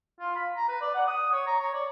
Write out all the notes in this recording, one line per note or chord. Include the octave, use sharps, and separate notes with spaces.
F4
B5
A#5
B4
D5
F#5
D#6
C#5
A#5
C#5
D5